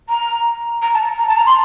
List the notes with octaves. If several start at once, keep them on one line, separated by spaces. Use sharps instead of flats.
A#5
A#5
A5
A#5
A5
A#5
C6